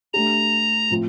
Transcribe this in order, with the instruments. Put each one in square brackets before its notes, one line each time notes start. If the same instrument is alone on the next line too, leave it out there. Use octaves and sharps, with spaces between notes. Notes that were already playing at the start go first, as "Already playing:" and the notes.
[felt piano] A3 D4 G4 [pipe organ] A#5
[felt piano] A2 F3 C4